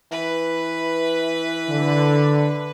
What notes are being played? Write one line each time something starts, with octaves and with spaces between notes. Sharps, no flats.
E3 B4
D3